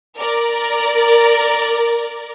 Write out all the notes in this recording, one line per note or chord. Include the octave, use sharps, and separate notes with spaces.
A#4 D5